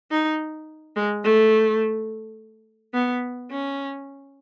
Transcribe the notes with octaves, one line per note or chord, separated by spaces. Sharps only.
D#4
G#3
A3
B3
C#4